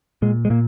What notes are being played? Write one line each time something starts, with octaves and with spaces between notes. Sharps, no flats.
A#2 G#3
G#3
A#2 A#3